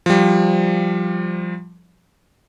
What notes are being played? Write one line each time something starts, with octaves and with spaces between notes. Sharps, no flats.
F3 G3